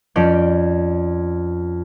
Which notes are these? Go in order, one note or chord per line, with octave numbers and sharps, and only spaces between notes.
F2 C#4 C#5 D5 G6